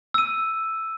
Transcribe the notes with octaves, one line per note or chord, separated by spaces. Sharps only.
E6 D#7